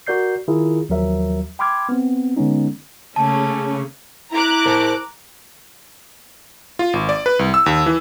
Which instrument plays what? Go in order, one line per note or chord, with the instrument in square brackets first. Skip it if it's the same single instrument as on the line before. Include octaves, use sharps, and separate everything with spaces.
[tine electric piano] F#4 A#4 D5 G6 C7
D#3 E4 F4 G#4 A#4
D#2 F3 F#3 A#4 E5
G5 B5 C6 D6 F6 G#6
B3 C4
D3 G#3 B3 C#4 D#4
[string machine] C#3 [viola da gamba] A3 A#3 C#4 [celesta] A5
[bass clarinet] E4 [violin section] A#5 D6 F#6
[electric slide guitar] A#4 C5 A5
[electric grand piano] F4
G#1
D5
B4
C2
E6
D#2
E3